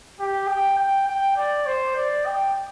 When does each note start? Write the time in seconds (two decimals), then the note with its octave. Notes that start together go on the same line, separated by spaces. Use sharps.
0.20 G4
0.48 G5
0.79 G5
1.08 G5
1.37 D5
1.67 C5
1.96 D5
2.26 G5